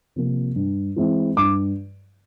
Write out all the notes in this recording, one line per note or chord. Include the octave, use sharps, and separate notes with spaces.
C3 F3 A#3
G2
E3 G#3 C4 E4
G2 D6